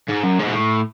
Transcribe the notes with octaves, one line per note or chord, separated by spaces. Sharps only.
G#2
F#2
G#2
B2
A2